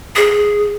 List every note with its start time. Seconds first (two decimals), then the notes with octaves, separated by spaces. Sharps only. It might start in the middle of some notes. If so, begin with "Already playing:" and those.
0.16 G#4